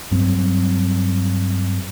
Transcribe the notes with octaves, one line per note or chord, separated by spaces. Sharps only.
G2 F#3 C4